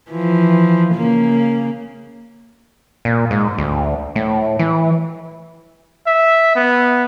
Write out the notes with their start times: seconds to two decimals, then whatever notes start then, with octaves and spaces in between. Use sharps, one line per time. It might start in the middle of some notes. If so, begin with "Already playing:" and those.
0.11 E3 F3
0.94 C#3 A#3
3.05 A#2
3.31 G#2
3.58 D2
4.15 A2
4.59 E3
6.07 E5
6.56 B3